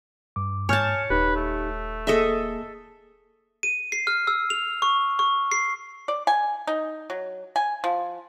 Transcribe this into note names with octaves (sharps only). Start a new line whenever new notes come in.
G2 D6
G#2 C#5 G#5 A5 F6 G6
D#1 D#4 G4 B4
A3
A#3 G#4 A4 D#5 E5
D#7
C7
F6
E6
F7
C#6
C#6
C7
D5
G#5
D#4
F#3
G#5
F3